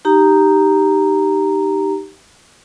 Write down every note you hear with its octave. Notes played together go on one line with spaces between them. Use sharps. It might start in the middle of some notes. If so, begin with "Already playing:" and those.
D#4 G4 A#5